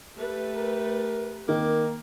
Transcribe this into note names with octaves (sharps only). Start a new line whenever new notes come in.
A3 G4 B4
A#4
D#3 A#3